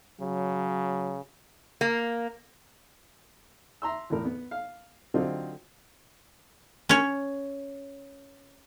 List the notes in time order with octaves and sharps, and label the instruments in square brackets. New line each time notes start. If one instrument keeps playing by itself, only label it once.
[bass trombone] C#3 [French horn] F#3
[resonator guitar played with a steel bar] A#3
[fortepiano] E5 A#5 C6 E6
E2 A2 A#4
B3
F5
D3 F#3 C4 D#4 F4 G4
[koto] C#4 C#5